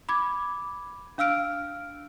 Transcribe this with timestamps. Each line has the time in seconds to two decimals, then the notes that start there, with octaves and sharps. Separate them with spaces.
0.09 B5 D6 G#6
1.18 D4 F5 E6 F6 D7